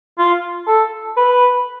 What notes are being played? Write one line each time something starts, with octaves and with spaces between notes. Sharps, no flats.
F4
A4
B4